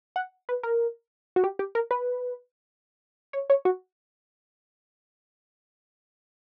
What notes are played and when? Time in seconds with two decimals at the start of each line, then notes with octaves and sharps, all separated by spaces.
0.16 F#5
0.49 B4
0.63 A#4
1.36 F#4
1.44 G4
1.59 G4
1.75 A#4
1.91 B4
3.33 C#5
3.50 C#5
3.65 F#4